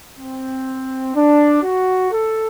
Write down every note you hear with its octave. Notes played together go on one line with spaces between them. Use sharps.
C4
D4
F#4
A4